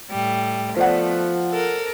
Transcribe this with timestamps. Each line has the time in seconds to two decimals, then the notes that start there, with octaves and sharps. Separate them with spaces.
0.11 A2 G3
0.76 F3 A3 B3 C5 D5 F#5
1.51 A4 A#4